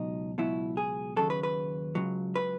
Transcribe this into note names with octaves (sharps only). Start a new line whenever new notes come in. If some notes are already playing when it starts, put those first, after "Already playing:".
Already playing: C#2 B2 F#3 D#4
C#2 B2 F#3 E4
G#4
D#2 C#3 F#3 A4
B4
B4
C#2 C#3 F#3
B4